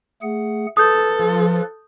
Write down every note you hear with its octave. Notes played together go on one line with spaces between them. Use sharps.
A3 G#4 F#5
A4 B4 D#6 G6
F3